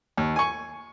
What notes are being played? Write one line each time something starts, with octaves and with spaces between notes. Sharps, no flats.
D#2
G#5 C#6